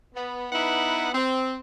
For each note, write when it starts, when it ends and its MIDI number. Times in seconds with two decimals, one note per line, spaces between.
0.15 0.46 59
0.52 1.08 59
0.52 1.08 63
0.52 1.08 64
0.52 1.08 71
0.52 1.08 78
1.14 1.57 60